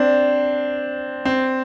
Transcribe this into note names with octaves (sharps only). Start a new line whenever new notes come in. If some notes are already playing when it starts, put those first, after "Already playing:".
Already playing: C4 D4
C4